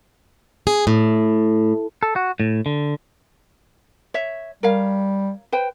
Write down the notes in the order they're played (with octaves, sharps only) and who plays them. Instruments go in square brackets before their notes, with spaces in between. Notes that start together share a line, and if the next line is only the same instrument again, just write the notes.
[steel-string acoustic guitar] G#4
A2
[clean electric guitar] A4
F#4
A2
D3
[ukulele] C#5 E5
[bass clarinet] G3 [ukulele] A#4 C#5 F5
[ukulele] B4 C5 G5